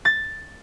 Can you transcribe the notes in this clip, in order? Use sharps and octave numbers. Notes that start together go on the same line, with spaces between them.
A6